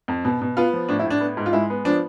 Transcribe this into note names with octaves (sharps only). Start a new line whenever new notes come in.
F2
B2
B2
B3 F4
F3
A2 D4
E4
A2 D4
B3
G#2
F4
G#3 E4
B3
F3 D4